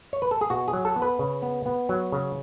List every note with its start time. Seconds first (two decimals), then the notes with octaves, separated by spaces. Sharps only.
0.13 C#5
0.22 B4
0.31 A4
0.41 G#4
0.50 B2 F#4
0.68 G#4
0.73 F#3
0.85 A4
0.96 B3
1.02 B4
1.19 C#3
1.42 B3
1.66 B3
1.89 F#3
2.12 C#3